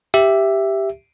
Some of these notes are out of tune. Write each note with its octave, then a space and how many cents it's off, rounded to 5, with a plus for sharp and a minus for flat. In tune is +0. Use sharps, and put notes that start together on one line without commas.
G4 +0 E5 +5